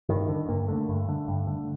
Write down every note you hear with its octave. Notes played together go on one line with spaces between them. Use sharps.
G2 D#3
D3
G2 A#3
D3 A3
G2
D3
G2
D3